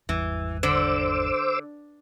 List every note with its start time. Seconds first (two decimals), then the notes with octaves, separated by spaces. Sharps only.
0.09 G#1 E2 E3 G3
0.63 D3 C5 D6 E6